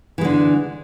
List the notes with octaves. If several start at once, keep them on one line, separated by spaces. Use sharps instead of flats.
D3 E3 G#3